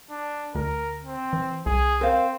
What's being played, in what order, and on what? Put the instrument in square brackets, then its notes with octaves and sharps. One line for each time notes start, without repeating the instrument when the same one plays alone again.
[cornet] D4
[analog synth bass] D2 [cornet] A#4
[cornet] C4
[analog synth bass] E3
[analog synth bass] C2 [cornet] G#4
[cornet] C4 [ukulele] A#4 C5 F5